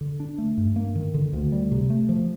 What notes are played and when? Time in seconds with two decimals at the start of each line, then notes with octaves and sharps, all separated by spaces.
0.01 D3
0.20 D4
0.38 A3
0.58 G2
0.76 A#3
0.95 D#3
1.14 D3
1.33 D2
1.52 G3
1.72 C3
1.90 A3
2.09 F3